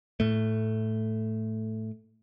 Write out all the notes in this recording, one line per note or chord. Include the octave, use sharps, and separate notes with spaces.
A2 A3